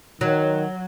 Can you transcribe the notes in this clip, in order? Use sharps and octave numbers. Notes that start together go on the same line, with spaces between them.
D#3 F#3